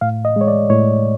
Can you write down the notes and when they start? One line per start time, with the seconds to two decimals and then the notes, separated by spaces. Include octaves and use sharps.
0.01 A2 F5
0.25 D#5
0.36 G#3 C#5
0.48 D5
0.70 A2 C#5